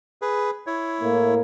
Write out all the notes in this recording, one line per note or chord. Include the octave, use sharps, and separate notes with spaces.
G#4 B4
E4 C#5
A2 A3 A#3